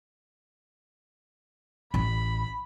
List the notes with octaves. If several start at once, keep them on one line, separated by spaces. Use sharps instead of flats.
A1 B5